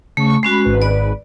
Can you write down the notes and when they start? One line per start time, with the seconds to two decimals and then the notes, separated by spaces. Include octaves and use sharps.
0.17 C#3 A3 C#6
0.43 G#3 C#4 F#4 B5
0.65 G#1 G#2 B4
0.82 D5